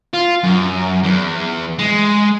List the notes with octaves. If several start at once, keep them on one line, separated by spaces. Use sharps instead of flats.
F4
F#2
E2
G#3